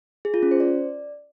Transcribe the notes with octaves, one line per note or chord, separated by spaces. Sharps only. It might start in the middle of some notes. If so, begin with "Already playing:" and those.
G#4
F4
C#4
C5
D5